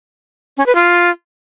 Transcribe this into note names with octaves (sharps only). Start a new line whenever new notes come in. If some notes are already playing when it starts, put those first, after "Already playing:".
C#4
B4
F4